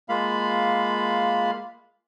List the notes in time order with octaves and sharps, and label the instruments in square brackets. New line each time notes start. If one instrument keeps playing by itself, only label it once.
[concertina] G#3 A#3 F4 F5 B5